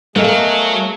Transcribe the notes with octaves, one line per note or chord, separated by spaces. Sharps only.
F#3 A3 A#3 G#4 A4 D#5